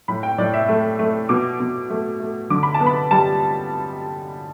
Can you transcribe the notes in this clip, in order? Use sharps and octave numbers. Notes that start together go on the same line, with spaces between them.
A2 B5
G5
A2 D5
E5
A3
A3
B2 D6
B2
A3
A3
D3 D6
B5
A5
B3
B5
G3 A5